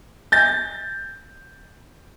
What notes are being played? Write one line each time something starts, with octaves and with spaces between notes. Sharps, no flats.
G6 A6